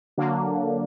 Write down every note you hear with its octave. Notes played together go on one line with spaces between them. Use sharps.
D3 F#3 A#3 D4